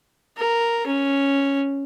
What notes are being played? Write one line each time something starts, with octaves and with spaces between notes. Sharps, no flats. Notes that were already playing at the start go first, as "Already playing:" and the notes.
A#4
C#4